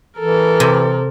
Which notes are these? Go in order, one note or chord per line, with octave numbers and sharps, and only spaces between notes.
E3 A4 A#4
C3